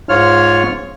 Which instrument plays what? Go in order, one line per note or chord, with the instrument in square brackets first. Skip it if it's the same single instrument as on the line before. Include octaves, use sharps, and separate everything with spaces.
[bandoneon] G#2 F4 C#5 F6